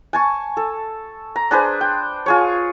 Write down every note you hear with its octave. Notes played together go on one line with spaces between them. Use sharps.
G#5 A5 C#6
A4
A#5
D4 G#4 B4 C5
G5
F4 G#4 C#5